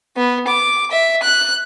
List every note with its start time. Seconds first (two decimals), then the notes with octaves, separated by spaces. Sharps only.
0.17 B3
0.48 D6
0.91 E5
1.23 F#6